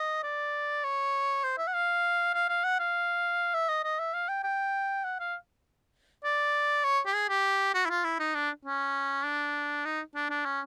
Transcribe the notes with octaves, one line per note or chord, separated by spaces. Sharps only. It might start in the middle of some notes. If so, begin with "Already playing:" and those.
Already playing: D#5
D5
C#5
C5
E5
F#5
F5
F5
F5
F#5
F5
E5
D#5
D#5
E5
F5
G5
G5
F#5
F5
D5
C#5
G4
G#4
G4
F#4
E4
F4
E4
D#4
D4
C#4
D4
D#4
D4
D4
C#4